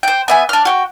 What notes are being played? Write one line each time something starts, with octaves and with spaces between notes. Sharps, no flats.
C5 G5
B3 E5 G#5
D4 F6
F#4 G5